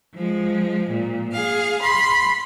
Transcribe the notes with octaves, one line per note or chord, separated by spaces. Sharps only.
F3 G#3
A#2
G#4 F5
B5 C6